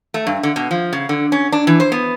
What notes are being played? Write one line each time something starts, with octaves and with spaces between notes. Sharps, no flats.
A3
G2
D3
B2
F3
C#3
D3
C#4
D4
E3
C5
B3